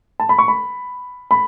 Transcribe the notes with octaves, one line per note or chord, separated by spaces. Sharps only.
A5
B5
C#6
B5
B5